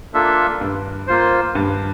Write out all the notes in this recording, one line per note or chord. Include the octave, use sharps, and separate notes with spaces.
A#3 D4 F4 A4 E5
G2
A#3 F4 C5
G2